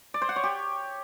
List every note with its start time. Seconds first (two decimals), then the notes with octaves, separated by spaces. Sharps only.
0.14 D5
0.22 C5
0.29 F#5
0.36 C#5
0.43 G4